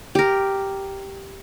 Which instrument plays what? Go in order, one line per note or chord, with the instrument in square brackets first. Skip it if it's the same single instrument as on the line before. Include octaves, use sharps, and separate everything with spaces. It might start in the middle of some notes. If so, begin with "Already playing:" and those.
[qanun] G4 A#4